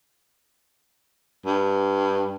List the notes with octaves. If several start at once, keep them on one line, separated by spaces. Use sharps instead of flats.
G2